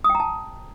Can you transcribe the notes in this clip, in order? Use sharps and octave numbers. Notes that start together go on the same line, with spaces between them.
D#6
G5
A#5
A5